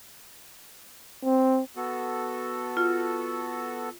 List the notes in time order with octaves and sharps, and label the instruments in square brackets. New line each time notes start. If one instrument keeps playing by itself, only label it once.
[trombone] C4
[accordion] B3 F#4 A4
[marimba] F4